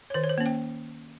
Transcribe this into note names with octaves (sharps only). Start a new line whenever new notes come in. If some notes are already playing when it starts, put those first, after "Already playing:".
C#5
D#3 C5
C#5
C5
A#3 C#4
G5